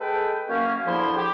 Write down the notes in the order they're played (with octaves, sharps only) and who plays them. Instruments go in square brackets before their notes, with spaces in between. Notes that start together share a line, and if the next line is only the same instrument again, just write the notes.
[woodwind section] G#3 A4 B4 G5
F#2 A#3 C#4
E2 D3 F3 E4 C5 C6
G4